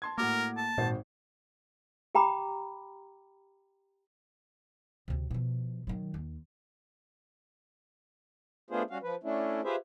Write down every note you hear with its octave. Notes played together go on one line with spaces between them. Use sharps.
A5 C6 G#6
A2 A#3 F#4 A#4 D6
A5
G#1 A#2 F#4 C5
G4 G5 A#5 B5 D6
D2 C3
B2 F3
D#3 F#3
D#2
A3 B3 D4 F4 G#4 C5
G3 C#4 F#4 F5
F3 B4
A3 C#4 D4 E4
F4 G4 G#4 B4 C5 E5